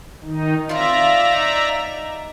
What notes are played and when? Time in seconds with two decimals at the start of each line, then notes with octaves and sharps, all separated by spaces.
0.24 D#3 D#4
0.69 C4 F4 D5 E5 A#5
1.32 D#4